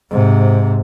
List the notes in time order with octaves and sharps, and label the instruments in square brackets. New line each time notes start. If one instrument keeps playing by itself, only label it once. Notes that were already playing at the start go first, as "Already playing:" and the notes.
[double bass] G#2 C3